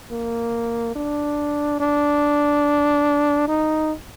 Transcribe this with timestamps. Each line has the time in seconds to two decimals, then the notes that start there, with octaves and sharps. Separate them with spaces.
0.11 A#3
0.96 D4
1.80 D4
3.48 D#4